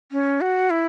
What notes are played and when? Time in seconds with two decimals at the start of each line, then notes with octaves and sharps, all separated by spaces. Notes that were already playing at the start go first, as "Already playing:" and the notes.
0.12 C#4
0.41 F#4
0.70 E4